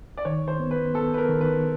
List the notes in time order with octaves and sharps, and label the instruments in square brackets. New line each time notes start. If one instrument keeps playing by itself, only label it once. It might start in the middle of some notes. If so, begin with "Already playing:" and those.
[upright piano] D5
[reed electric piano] D#3 [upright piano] C#5
[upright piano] C5
[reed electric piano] B3
[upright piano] B4
[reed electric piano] B3 [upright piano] A4
[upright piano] B4
A#4
[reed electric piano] D#3
[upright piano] B4